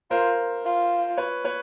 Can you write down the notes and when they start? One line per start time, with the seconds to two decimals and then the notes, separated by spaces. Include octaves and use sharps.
0.11 F4 A#4 C5
0.65 F4
1.17 B4 C#5
1.44 B4 C#5